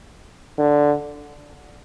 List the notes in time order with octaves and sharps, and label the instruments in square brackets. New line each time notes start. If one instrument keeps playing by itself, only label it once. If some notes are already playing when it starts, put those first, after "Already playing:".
[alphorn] D3